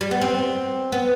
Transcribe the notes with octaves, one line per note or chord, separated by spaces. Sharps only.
G3
B3
C4
B3